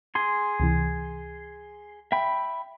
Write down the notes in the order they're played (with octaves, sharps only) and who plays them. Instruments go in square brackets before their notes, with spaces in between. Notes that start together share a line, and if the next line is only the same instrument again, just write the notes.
[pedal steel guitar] G#4 C6
[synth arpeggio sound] C#2 C3 E3
[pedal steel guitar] E5 G5 B5